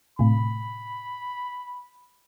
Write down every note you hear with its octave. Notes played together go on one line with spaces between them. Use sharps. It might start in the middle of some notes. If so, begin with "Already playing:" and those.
A2 C3 B5